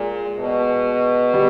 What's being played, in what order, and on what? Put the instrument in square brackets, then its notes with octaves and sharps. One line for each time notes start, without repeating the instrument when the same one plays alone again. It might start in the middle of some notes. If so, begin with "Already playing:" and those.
Already playing: [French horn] A#2 [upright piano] G#3
[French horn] B2
[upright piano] G3